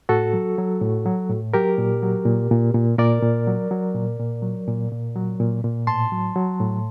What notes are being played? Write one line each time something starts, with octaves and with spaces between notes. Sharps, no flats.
A2 F#4 A4
F#3
F#3
A2
F#3
A2
F#3 G4 A#4
A#2
F#3
A#2
A#2
A#2
A#2 A#4 D5
A#2
F#3
F#3
A#2
A#2
F#3
A#2
A#2
F#3
A#2
A#2
A2 A5 C6
F#3
F#3
A2